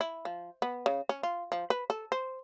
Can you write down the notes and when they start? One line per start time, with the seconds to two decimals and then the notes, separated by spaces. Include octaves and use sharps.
0.01 E4
0.25 F3
0.62 B3
0.86 C#3
1.09 C#4
1.23 F4
1.52 F3
1.70 B4
1.90 A4
2.12 C5